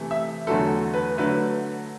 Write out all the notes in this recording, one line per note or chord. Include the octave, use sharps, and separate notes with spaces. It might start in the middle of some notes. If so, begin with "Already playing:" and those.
Already playing: C3 E3 A3
E5
E2 D3 F#3 A3 A4
B4
D3 F#3 A3 B4